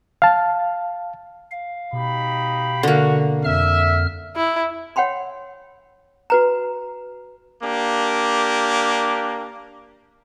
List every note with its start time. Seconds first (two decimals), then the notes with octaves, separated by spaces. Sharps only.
0.22 F5 A5
1.51 F5
1.93 B2 D#4 G4 B5
2.83 D3 A#3 F#4
3.44 F2 E5 F6
4.36 E4
4.96 C#5 F#5 G5 B5 C6
6.30 F#4 B4 A#5
7.62 A#3 D4 G4